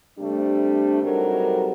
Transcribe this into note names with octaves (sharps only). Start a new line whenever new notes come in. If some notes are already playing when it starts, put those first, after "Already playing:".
C3 G3 A3 D4
C3 F#3 G3 D#4 A4 A#4